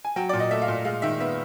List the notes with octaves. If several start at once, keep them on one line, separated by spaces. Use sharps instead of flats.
G#5
F#3 G5
A#2 D5
D#5
A3 E5
F5
A#2
G#3 F5
D#3 E5
B3 E5